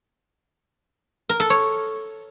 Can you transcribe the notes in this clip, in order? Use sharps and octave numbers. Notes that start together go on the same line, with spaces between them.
A#4
A4
C#5